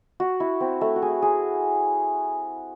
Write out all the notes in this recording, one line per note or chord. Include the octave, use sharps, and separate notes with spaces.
F#4
E4
C4
A3
F#4
G#4
G#4